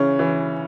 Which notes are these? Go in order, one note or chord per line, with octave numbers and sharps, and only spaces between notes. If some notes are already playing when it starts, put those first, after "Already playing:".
Already playing: C#3 E3 C#4
E3